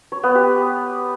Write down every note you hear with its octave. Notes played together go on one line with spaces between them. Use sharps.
C#5
B3
G4